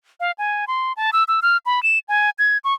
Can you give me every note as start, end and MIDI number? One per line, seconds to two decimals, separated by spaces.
0.20 0.32 77
0.38 0.65 80
0.68 0.93 84
0.97 1.10 81
1.13 1.24 88
1.28 1.40 88
1.42 1.57 89
1.66 1.83 83
1.83 1.99 100
2.08 2.30 80
2.39 2.58 92
2.64 2.74 85